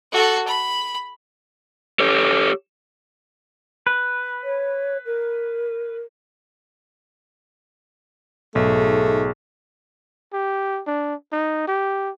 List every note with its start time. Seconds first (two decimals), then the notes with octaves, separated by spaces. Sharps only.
0.12 F#4 A4
0.47 B5
2.00 G4 A4 C#5
3.87 B4
4.43 C#5
5.06 A#4
8.55 B1 G#2 A3
10.33 G4
10.87 D4
11.32 D#4
11.68 G4